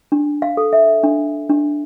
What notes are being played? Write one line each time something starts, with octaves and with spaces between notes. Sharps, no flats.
D4
F5
A4
E5
D4
D4